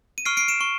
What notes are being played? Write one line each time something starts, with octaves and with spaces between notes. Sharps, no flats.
D#7
C#6 F6 C7 D7
C7 D7
D7 E7
C#6